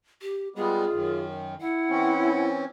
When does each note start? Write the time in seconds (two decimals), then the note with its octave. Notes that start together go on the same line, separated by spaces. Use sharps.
0.22 G4
0.56 G3 G#3 B3 F4 G#4
0.92 F#2 D#3
1.61 E4 F#5
1.90 E3 C4 C#4